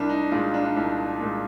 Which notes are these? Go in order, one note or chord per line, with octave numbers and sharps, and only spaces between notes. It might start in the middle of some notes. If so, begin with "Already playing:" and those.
Already playing: C2 D4
D#4
A#2 G#3 F4
D4
D4
C2 D#4
A#2 G#3